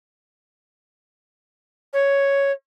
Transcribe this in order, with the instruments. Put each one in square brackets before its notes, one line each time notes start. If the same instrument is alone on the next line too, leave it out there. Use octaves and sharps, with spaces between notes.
[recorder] C#5